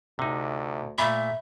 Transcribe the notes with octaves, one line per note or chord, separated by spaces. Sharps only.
D2 C3 D#4
A#2 A3 E5 B5